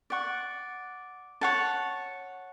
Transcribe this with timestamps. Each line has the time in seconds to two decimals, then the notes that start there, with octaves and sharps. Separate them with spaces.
0.10 D5 F#5 C#6
1.41 C#5 F#5 A5